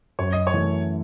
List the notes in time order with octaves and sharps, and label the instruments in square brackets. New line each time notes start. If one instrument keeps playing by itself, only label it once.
[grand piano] F#2 [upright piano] C#5
[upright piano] D#5
C#5
[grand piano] E3 A3